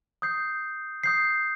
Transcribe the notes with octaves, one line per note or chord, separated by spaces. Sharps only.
D#6 G6 C7
D#6 G6 C7